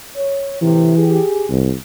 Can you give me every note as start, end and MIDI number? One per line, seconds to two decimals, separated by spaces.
0.16 0.55 73
0.62 0.92 45
0.62 0.92 48
0.62 1.18 52
0.97 1.49 67
0.97 1.49 68
1.50 1.73 36